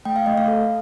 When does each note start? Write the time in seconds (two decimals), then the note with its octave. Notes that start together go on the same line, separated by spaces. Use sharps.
0.05 A3 G5
0.16 F5
0.26 A3 D#5
0.37 F5
0.48 A4